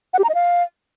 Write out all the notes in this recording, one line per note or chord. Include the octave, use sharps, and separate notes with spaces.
F#5
G4
A#5
D#5
F5